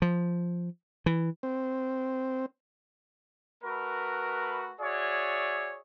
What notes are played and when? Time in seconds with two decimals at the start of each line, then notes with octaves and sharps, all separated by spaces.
0.02 F3
1.06 E3
1.43 C4
3.64 A3 F#4 A#4 B4
4.81 F#4 G#4 C#5 D5 E5